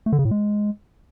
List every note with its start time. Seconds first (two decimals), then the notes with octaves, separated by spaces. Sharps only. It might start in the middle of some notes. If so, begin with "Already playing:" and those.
0.06 A3
0.12 D3
0.19 C#3
0.25 A2
0.31 G#3